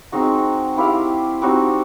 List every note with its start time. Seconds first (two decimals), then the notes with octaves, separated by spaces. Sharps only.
0.12 G#3 C4 D#4 F#4
0.77 E4 G4 C5 F5
1.42 G3 C4 D#4 F#4